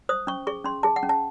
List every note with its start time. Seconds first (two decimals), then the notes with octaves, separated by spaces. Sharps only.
0.09 C5 D#6
0.27 C#4 C#6
0.47 G#4 C#6
0.65 C#4 C6
0.83 G#4 A5
0.96 F#5
1.03 C#4
1.09 A5